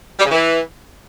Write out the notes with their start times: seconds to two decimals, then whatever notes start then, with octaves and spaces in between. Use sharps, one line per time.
0.20 G3
0.25 C#3
0.31 E3